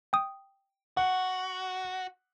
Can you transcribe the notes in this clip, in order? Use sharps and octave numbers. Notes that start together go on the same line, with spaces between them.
G5 D#6
F#4 F#5